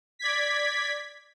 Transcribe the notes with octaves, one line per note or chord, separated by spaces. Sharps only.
D5 G#6 B6